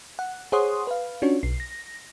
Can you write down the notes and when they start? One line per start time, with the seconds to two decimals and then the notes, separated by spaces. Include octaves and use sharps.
0.19 F#5
0.52 G#4 C5 C#5 F#5 C6 D#6
0.87 B4 F5
1.22 C#4 D4 F4 F#4 C#5
1.43 B1 C7
1.60 A#6